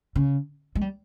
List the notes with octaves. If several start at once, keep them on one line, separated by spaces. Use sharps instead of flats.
C#3
G#3
G3